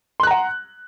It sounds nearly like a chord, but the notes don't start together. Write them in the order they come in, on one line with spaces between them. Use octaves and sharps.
C6 F#6 A#5 F#5